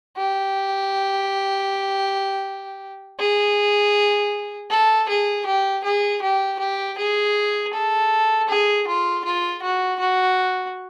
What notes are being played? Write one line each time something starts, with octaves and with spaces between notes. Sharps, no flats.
G4
G#4
A4
G#4
G4
G#4
G4
G4
G#4
A4
G#4
F4
F4
F#4
F#4